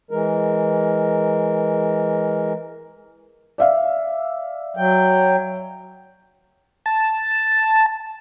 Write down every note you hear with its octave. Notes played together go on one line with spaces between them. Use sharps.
E3 G#3 A#4
D5 E5 F5
F#3 G5
A5